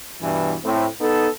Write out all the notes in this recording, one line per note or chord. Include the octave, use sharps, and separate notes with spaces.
G2 B2 E3
A2 C4
B3 D#4 A4